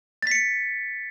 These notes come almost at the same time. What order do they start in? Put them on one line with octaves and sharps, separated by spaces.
A6 B6 C#7